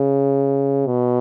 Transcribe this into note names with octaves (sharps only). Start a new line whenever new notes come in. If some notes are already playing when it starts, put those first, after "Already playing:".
Already playing: C#3
B2